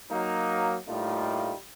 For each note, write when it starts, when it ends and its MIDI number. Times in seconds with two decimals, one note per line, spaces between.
0.10 0.74 54
0.10 0.74 58
0.10 0.74 63
0.87 1.52 45
0.87 1.52 55
0.87 1.52 57
0.87 1.52 58
0.87 1.52 63
0.87 1.52 65